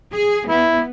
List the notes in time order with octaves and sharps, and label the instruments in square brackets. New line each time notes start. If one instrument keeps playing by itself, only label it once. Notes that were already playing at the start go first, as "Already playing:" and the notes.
[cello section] G#4
[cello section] B3 [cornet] E4